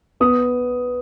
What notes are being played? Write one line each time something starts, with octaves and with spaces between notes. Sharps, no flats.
B3 D#6